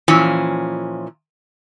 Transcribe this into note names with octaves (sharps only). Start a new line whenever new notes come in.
A#2 E3 F3 C#4